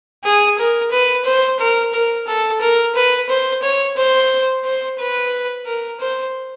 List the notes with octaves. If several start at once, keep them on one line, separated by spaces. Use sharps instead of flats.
G#4
A#4
B4
C5
A#4
A#4
A4
A#4
B4
C5
C#5
C5
C5
B4
A#4
C5